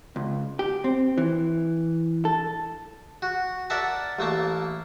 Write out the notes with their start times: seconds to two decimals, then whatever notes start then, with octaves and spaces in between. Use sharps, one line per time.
0.16 C#2
0.59 G4
0.84 C4
1.18 E3
2.25 A4
3.22 F#4
3.70 A#4 D5 E5 F#5 A5
4.19 A1 A3 A#3 A5